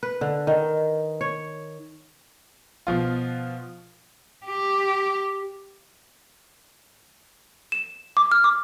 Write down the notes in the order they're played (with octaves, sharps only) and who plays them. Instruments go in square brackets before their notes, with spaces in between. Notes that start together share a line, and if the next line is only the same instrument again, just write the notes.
[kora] B4
D3
D#3
C#5
[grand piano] B2 F3 F4
[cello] G4
[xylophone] E7
D6
F6
D6